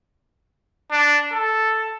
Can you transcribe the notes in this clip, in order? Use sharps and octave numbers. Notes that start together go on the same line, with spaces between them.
D4
A4